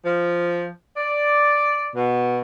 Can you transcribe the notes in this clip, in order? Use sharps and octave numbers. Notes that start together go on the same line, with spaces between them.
F3
D5
B2